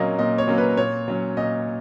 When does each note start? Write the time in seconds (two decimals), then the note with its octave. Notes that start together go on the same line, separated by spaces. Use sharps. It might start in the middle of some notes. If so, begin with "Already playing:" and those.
Already playing: A#2 F#3 A#3 C#4 D#5
0.19 A#2 D#5
0.38 C#5
0.47 F#3 A#3 C#4
0.58 B4
0.77 A#2 C#5
1.08 F#3 C#4
1.37 A#2 D#5